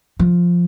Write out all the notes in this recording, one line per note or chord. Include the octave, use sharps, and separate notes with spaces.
F3